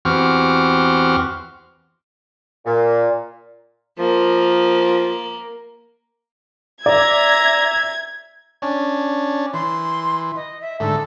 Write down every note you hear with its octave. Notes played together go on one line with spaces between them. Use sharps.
E2 C4 F#4 G4 F6
A#2
F3 A#3
D5 E5 A#5 G#6
C#4 D4
E3 C6
D#5
E5
G#2 D3 A3 A4